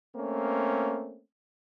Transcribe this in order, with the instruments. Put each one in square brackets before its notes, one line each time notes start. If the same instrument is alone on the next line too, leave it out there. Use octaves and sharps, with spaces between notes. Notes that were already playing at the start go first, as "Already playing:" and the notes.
[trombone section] A3 A#3 C4 C#4